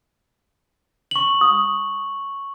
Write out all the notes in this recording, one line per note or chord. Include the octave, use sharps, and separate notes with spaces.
C#6 F#7
D#6